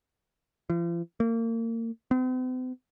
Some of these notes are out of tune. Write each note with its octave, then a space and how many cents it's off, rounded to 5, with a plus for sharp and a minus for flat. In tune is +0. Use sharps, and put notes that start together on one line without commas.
F3 -45
A#3 -30
C4 -45